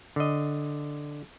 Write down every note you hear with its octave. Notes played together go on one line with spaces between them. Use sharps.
D3 D#5